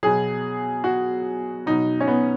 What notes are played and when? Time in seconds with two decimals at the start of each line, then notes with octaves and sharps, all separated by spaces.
0.03 B2 F#3 G#4
0.84 F#4
1.66 B2 F#3 D#4
2.00 C#4
2.07 B3